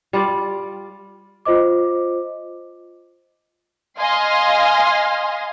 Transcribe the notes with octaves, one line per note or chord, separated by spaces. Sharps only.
G3 F4 D5
F4 C5 D#5 D6
D#5 F5 G#5 C6